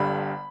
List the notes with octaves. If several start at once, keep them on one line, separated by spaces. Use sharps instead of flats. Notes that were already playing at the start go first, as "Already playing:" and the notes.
Already playing: G1 G2 D3 G3 B5